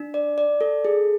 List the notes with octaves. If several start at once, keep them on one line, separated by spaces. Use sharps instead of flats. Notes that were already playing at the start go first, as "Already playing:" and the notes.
Already playing: D4
D5
D5
A4
G#4